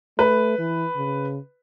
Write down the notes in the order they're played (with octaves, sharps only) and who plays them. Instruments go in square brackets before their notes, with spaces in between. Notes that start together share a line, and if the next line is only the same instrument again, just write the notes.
[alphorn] A3 [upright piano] B4
[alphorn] E3
C#3